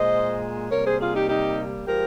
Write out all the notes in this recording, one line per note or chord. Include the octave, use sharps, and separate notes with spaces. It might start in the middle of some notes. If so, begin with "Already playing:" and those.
Already playing: A#2 G#3 C5 D#5
C3 G3 A#3 A#4 C#5
G#4 C5
F4 G#4
D#4 G4
D#4 G4
F3 G#3 G4 A#4